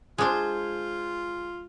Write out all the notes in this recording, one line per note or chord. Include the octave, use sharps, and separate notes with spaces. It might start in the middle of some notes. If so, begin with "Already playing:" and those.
G#3 D4 F4 G#4 C5